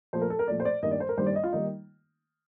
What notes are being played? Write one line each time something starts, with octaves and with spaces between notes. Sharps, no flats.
A#2 F3 A3 C5
A#4
A4
A#4
A#2 F3 A3 D5
C5
D5
G2 D#3 G3 A#3 D#5
D5
C5
A#4
G2 D#3 G3 A#3 C5
D5
D#5
F4
D#3 G3 A#3 D#4